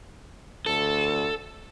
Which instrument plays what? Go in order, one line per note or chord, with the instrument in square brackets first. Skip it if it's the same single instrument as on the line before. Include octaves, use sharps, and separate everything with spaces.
[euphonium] D2 [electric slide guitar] A4